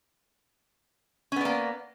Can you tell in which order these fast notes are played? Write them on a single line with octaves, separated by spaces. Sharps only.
C#4 B3 D5 A#3